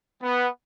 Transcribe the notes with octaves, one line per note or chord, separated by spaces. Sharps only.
B3